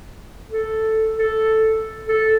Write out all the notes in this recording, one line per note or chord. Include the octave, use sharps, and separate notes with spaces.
A4
A4
A4